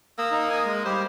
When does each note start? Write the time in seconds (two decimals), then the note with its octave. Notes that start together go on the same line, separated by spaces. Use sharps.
0.18 A#3 D#6 E6
0.32 D#4
0.49 G#5
0.65 G#3
0.85 G3 G4 C5 B5